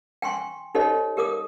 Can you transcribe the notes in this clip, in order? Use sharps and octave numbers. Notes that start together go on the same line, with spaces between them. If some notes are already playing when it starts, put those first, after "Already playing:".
G5 G#5 C6 C#6
D#4 G4 A4 C5 C#5 D#5
G4 A#4 D6 D#6